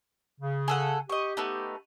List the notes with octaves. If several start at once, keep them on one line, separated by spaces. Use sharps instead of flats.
C#3
G#4 A4 F#5
G4 D#5 C#6
A3 B3 D#4